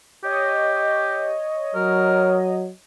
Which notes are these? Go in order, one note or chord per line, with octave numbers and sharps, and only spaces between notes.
G4 C#5 D#5
F#3 A#4